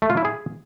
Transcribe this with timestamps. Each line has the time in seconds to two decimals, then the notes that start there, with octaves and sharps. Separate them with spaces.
0.02 A3
0.10 F4
0.17 E4
0.25 G#4